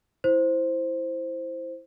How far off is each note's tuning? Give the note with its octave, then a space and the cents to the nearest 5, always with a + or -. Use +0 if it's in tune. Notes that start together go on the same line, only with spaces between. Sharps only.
E4 +0 C5 +0